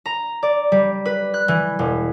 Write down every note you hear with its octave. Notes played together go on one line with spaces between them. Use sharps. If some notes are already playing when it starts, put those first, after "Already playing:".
A#5
D5
G3
B4
F#6
E3
E1